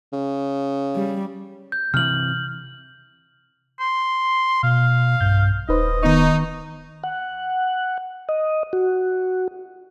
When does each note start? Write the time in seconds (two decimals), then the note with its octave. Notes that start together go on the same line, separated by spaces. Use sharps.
0.13 C#3
0.96 G3
1.72 G6
1.94 C3 D#3 E3 F6 F#7
3.80 C6
4.63 B2 F5
5.21 B1 G2 G6
5.69 D#1 D#4 B4 C5 D#5
6.03 D#3 B3 D#4 C#6
7.03 F#5
8.29 D#5
8.73 F#4